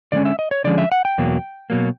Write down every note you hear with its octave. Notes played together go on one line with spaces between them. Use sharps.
D3 F3 G#3 C#4 D5
E5
D#5
C#5
D3 F3 G#3 C#4 D5
E5
F#5
G5
E2 B2 F#3 A#3
B2 F#3 A#3